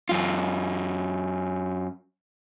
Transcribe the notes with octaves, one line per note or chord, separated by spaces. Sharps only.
F#2 F4